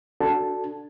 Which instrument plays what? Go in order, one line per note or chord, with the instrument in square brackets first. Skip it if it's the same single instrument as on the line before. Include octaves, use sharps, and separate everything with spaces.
[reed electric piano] D4 F#4 A4 A5